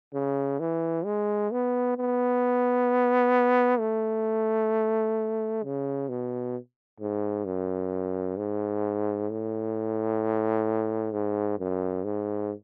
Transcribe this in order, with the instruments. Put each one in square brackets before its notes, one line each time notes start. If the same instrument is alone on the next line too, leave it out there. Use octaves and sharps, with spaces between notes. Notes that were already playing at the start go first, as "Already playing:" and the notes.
[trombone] C#3
E3
G#3
B3
B3
A3
C#3
B2
G#2
F#2
G#2
A2
G#2
F#2
G#2